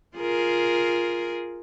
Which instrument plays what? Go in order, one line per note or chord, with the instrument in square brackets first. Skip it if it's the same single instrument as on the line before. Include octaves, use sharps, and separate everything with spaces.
[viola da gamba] F4 G#4 A#4